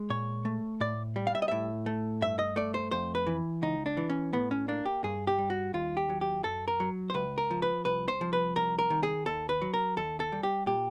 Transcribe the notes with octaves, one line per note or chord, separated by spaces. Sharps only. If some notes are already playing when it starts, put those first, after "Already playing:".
Already playing: G#3
A#2 C#5
A3
A2 D5
G3
F5
E5
D#5
A2 E5
A3
G2 E5
D#5
A3 D5
C5
F2 C5
B4
E3
C#2 D#4
D4
E3
C#4
A2 B3
C#4
A#3 D4
G4
G2 G#4
G4
G3
F#4
D#2 F4
G4
F#3
G4
F#2 A4
A#4
F#3
C5
C#2 B4
A#4
F3
B4
C2 B4
C5
F3
B4
C2 A#4
A#4
D#3
G#4
D#2 A4
B4
F#3
A#4
D#2 A4
A4
G3
G4
A#2 G4